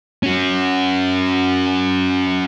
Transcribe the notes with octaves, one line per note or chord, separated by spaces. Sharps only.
C#4 F#4